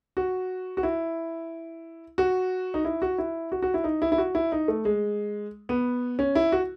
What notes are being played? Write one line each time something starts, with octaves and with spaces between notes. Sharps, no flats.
F#4
F#4
E4
F#4
D#4
E4
F#4
E4
F#4
F#4
E4
D#4
E4
E4
F#4
E4
D#4
A3
G#3
B3
C#4
E4
F#4